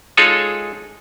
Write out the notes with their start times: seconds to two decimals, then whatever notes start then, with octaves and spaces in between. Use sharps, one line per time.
0.17 G#3 D#4 F4 G#4 A4 C#5